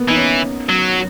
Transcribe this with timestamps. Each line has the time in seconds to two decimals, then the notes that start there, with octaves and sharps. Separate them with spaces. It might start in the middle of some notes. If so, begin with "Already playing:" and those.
Already playing: A#3 B3
0.09 E3 D#4
0.16 C#4
0.69 F#3